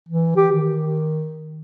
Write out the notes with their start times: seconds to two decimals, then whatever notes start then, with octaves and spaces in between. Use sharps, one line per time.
0.09 E3
0.37 G4
0.52 D#3